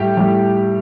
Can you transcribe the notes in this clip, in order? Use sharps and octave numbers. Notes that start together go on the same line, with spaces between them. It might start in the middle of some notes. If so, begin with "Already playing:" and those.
Already playing: A2 G3 G4
A2 G3